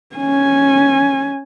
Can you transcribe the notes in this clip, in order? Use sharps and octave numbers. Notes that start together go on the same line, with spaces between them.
C#4 G#5